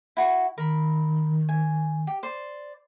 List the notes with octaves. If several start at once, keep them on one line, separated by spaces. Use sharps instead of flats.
E4 F#4
D#3 A#4 B5
G#5
G4
C5 D5